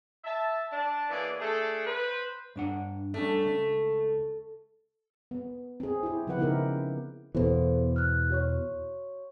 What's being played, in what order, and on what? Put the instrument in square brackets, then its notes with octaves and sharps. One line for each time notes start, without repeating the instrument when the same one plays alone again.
[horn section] E5 A5
D4 A5
E3 A#3 B3 G#4 C#5 D5
A3 D4 G#4 A4
B4 C5
[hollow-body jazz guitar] G2 D4 F#5
[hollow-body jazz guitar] G3 C#4 D4 [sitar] A3
[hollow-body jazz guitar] C#2
[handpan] B3
C4 G#4
E4 G4
C#3 F3 C4 E4 B4 F#5
C#3 B3 D#4 G4 A#4 E5
[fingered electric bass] E2 B2 E3 [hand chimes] B3 A4 C5
[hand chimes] F6 F#6
F#4 C#5 C#6